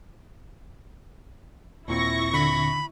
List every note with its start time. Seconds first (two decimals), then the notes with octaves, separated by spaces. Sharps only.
1.88 D#2 A#2 C4 E4 C#6 A#6
2.34 D3 B5